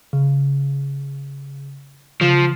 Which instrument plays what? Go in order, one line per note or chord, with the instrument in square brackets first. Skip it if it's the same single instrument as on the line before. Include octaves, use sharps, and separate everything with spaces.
[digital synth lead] C#3
[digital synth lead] C#3 [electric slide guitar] F3